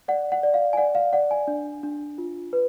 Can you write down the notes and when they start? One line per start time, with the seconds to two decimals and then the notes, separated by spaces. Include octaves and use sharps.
0.08 D5 F#5
0.32 F#5
0.43 D5
0.54 F5
0.73 G#5
0.77 D5 F#5
0.95 F5
1.13 D5 F#5
1.31 G#5
1.48 D4
1.83 D4
2.18 F4
2.53 B4